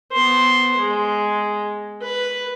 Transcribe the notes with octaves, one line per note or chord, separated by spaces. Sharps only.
B3 C5
G#3
B4